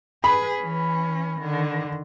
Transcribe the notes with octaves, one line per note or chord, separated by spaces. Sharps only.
G#4 B4 B5
E3 C#4
D3 D#3